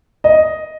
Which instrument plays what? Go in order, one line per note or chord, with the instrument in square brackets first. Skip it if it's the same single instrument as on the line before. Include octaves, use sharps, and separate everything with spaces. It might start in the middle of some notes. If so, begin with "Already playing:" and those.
[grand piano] D#5